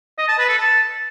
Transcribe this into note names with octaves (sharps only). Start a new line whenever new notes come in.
D#5
A5
B4
A4
A5